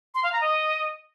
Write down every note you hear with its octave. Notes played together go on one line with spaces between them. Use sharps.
C6
F5
A#5
D#5